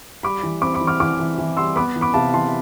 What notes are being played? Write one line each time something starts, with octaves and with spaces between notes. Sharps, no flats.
G3 B5 D6
E3
C4 B5 D6
B5 D6
E3
D6 F6
E3 D6 F6
E3
E3
G3 C6 E6
B3 B5 D6
E3
B5 D6
C3 F5 A5
E3 A5 C6